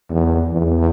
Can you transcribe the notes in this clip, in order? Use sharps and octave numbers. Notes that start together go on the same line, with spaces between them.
E2
E2